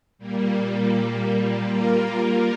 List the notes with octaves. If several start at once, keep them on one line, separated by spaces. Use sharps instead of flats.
A#2 G3 A#3
G3 A#3 F4 A#4